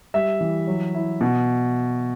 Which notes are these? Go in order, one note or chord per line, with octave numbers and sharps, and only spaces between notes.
G3 E5
E3
F#3
E4
B2